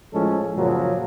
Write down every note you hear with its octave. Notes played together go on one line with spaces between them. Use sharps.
A2 F3 G#3 C#4 A4
F#2 A#2 C#3 F3 F#3